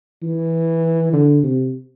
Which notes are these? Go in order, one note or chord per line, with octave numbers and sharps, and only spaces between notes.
E3
D3
C3